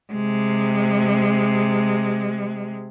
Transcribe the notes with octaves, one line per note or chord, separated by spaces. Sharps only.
C3 G#3